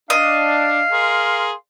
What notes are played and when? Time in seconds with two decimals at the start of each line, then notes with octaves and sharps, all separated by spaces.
0.10 D4 D#5 F5
0.92 G#4 A#4 C6